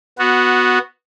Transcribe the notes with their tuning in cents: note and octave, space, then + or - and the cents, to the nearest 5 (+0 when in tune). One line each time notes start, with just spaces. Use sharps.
B3 +0 F#4 -10